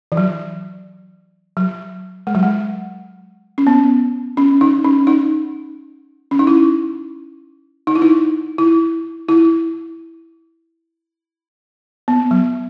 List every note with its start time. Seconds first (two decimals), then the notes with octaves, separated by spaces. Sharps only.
0.12 E3
0.17 F#3
1.57 F#3
2.27 G#3
2.35 F#3
2.43 G#3
3.58 C#4
3.67 B3
4.37 C#4
4.61 D#4
4.84 C#4
5.07 D#4
6.31 C#4
6.39 D#4
6.47 E4
7.87 D#4
7.95 E4
8.02 D#4
8.58 E4
9.29 E4
12.08 B3
12.31 F#3